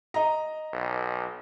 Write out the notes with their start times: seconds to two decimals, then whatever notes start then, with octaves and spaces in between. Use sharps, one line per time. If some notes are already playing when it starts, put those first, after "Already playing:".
0.14 D#5 A#5
0.73 B1